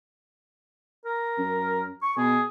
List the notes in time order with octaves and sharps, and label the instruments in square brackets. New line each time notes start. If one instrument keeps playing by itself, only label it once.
[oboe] A#4
[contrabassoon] F#2
[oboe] C#6
[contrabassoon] B2 [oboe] G#4